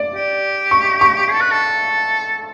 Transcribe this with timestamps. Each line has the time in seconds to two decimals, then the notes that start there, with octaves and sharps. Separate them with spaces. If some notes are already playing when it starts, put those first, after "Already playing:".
Already playing: D5
0.14 G4
0.71 C#6
1.01 C#6
1.30 A4
1.41 B4
1.51 A4